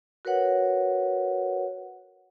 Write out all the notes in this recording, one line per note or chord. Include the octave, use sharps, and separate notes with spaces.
F#4 A#4 B4 C#5 F#5